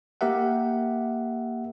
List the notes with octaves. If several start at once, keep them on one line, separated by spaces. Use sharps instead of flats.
A#3 G4 A#4 E5 F#5